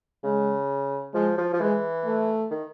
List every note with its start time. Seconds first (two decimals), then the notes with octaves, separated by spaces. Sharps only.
0.24 C#3 G#3
1.14 F3 G#3
1.38 F3
1.54 F3
1.60 E3 G#3
2.05 A3
2.51 D#3